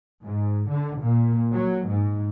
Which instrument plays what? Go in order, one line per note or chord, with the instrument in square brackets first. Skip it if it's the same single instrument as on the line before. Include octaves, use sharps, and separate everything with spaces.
[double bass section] G#2
D3
A#2
F#3
G#2